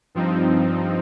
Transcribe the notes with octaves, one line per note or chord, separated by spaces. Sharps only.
G2 F3 C4 D#4